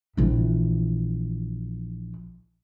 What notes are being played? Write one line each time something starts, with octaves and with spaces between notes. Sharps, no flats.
A#1 E3